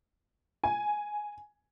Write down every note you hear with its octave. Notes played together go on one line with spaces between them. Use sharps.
G#5